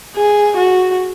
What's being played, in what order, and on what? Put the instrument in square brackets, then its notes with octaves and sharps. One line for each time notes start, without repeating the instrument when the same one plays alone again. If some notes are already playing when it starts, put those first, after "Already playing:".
[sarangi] G#4
F#4